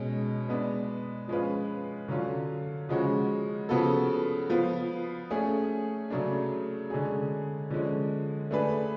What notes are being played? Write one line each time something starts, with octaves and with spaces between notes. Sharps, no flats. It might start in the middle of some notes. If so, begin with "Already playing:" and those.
Already playing: B2 G#3 C#4
G#3 B3 D4
F3 G#3 C#4 F4 B4
D3 F#3 C#4 F4
C#3 F3 G#3 C#4 F#4
C#3 F3 B3 F#4 A4
F3 B3 F4
A3 C#4 G#4
C#3 F#3 A3 D4
D3 G#3 C#4 G#4
D3 F3 G#3 C#4
A3 D4 G#4 B4